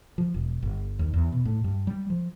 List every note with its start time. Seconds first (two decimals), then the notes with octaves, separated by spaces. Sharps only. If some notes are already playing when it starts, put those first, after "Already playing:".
0.18 F3
0.34 E1
0.63 G1
0.99 D#2
1.14 E2
1.32 B2
1.45 A2
1.64 G2
1.87 G3
2.10 F3